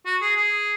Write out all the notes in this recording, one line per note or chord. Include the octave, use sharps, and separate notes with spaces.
F#4
G#4
G#4